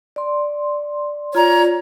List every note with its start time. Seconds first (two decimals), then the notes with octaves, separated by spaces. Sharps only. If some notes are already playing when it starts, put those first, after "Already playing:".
0.16 D5 C6
1.35 F4 C#5 D5 A#5